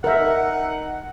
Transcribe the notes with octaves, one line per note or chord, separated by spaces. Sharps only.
D#4 A#4 E5 F#5